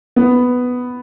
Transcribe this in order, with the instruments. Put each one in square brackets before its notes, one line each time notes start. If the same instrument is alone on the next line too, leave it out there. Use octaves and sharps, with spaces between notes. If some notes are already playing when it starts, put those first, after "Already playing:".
[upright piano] B3